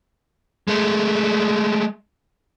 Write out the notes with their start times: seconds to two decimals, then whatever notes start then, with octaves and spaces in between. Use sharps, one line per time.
0.68 G#3 A3